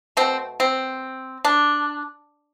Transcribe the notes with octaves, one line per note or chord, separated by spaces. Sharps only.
B2 A3 C4
C4
D4